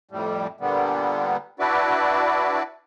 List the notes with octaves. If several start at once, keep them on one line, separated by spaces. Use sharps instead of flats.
F2 A2 G3
A#2 D3 G3 B3
D4 E4 F#4 B4 D5